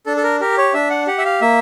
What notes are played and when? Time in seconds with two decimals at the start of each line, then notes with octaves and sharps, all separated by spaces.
0.06 D4 A4
0.17 A4
0.23 A#4
0.40 G4 A#4
0.58 C#5
0.74 D4 E5
0.90 F#5
1.07 G4 F#5
1.18 E5
1.25 F5
1.41 A#3 E5